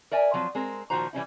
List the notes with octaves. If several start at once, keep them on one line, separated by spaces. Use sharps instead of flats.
A#4 D5 E5 G#5
F3 F#3 C4
G#3 C4 A#4
A#2 D#3 F3 F#4 C5 A#5
E3 G3 C#4 E4